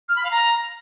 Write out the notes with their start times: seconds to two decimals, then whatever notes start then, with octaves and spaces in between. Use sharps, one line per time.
0.09 F6
0.16 B5
0.24 F5
0.31 A#5